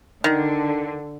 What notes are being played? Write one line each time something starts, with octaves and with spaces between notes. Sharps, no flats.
D3 D#3